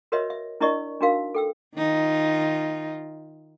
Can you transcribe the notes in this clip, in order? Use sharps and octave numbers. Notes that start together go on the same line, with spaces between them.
F#4 A#4 B4 C#5 D#5 E5
E5
D4 E4 A#4 D5 D#5 C#6
D4 D#4 F#4 A#4 F5
A4 G5 E6
D#3 D#4 F4